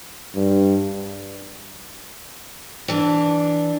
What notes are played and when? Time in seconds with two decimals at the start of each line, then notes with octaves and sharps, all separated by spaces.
0.35 G2
2.88 E3 D4